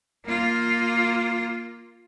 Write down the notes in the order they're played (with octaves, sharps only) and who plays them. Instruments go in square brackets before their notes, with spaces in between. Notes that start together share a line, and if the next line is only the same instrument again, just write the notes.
[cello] A#3 F4